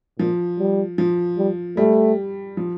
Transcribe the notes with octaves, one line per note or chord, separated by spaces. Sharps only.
A#2 F3
G3
F3
G3
G3 A3
F3